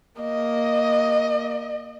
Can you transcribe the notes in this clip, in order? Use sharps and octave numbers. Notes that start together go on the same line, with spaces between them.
A#3 D#5